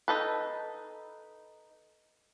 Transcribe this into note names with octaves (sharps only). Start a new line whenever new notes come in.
D#4 A4 B4